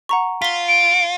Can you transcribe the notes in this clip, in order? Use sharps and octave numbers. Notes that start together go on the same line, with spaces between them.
F#5 A#5 C#6
F4 B6 G7
D7